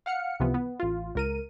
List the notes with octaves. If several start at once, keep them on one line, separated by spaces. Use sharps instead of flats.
F5 F#5 F6 C#7
C#2 C3 E3 F3 B3
B3
A1 F4
C#2 A#4 D#7